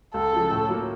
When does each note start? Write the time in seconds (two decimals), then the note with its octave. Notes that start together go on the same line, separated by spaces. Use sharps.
0.14 C#2 A4
0.33 C#3 F3
0.51 A2
0.69 F#3 A#3 F4